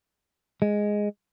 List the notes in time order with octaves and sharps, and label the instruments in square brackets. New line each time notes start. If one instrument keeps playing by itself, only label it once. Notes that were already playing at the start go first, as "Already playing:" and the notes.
[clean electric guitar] G#3